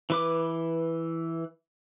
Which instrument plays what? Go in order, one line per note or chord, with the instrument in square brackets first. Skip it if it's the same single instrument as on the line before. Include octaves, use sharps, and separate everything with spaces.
[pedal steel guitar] E3 B4 D6